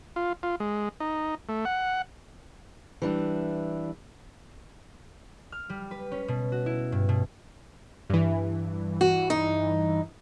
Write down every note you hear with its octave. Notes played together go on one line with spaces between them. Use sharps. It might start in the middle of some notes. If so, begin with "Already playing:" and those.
F4
F4
G#3
D#4
A3
F#5
E3 G3 D4
F6
G3
B4
C#4
B2
F#4
E4
G2
B2
G2 E3
F#4
D#4